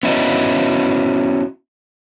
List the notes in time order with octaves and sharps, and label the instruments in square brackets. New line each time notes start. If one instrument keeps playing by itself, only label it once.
[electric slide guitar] B3 C#4 E4 F#4 D#5